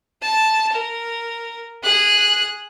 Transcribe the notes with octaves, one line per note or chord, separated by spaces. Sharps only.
A5
A#4
G#4 F#6